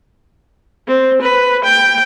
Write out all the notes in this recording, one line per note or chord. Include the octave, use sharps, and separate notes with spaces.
C4
B4
G5